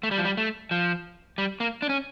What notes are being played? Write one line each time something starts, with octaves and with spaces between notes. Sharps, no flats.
A3
G3
F3
G3
A3
F3
G3
A#3
D4
C#4